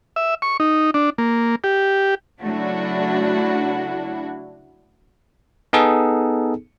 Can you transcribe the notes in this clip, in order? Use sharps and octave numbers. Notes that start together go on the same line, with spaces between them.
E5
C#6
D#4
D4
A#3
G4
C#3 F#3 A3 D4 E4 F#4
B3 D#4 G#4 A4